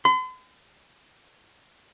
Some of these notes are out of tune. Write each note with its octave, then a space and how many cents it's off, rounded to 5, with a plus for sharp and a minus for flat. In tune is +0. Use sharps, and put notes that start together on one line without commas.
C6 -45